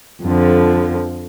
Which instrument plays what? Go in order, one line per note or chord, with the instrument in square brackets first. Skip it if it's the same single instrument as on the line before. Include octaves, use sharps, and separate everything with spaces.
[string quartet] F2 D3 F3